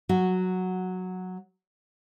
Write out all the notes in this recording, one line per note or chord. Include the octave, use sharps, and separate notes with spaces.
F#3 F#4